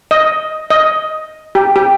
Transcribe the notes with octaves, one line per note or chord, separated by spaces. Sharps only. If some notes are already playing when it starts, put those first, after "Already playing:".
D#5
D#5
G4
G4